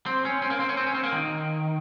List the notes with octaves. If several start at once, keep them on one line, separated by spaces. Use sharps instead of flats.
C4
C#4
C4
A#3
C4
C#4
C4
C#4
C4
A#3
D#3